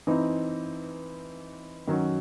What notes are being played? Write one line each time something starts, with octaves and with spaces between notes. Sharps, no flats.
E3 C4 D#4
D#3 F#3 C#4 F#4